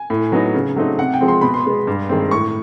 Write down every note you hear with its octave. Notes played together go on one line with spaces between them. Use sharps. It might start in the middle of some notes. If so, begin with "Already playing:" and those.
Already playing: G#5
A2
F#3 B3 D#4
C#3
F#3 A3 C4 D#4
C3 F#5
G5
F3 G#3 C4
C6
B2 B5
C6
G#3 B3
G2
D#3 G#3 C4
A2 C#6